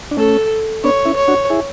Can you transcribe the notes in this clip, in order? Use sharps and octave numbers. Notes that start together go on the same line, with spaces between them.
D4
A3 C#4 A4
B3 D4 C#5
C#4 E4
C#5
D4 F#4
E4 G#4